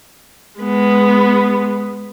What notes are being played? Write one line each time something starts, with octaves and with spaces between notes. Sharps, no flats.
G#3 B3